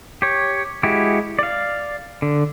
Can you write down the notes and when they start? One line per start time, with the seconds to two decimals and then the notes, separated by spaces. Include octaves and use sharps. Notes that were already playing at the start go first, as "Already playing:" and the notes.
0.22 G4 C#5
0.83 G#3 E4 F#4 G4
1.39 D5 F5
2.22 D3